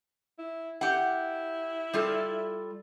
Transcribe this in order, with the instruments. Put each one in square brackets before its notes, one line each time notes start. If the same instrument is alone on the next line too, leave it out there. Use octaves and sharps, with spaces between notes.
[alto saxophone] E4
[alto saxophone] E4 [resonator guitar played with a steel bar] G4 F#5
[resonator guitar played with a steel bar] G3 F4 A4